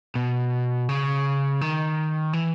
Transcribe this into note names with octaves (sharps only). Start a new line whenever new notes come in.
B2
C#3
D#3
E3